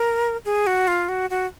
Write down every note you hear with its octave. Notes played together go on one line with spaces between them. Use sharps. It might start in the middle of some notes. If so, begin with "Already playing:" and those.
Already playing: A#4
G#4
F#4
F4
F#4
F#4